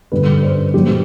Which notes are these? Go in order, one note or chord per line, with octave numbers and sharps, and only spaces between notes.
G2 D3 G3 B4
C5
A#2 F#3 G4